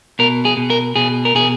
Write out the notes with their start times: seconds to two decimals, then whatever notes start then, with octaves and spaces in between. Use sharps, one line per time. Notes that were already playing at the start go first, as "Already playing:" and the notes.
0.19 B2 A#4
0.45 G#4
0.57 B2
0.70 A#4
0.96 B2 G#4
1.25 A#4
1.35 B2 G#4